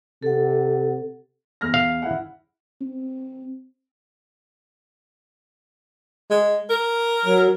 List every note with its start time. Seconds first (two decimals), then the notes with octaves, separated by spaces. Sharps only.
0.23 C3 A4 F#5
1.61 E2 F6 A#6
1.74 F5
2.02 E4 F#5
2.81 C4
6.30 G#3
6.70 A#4
7.25 F#3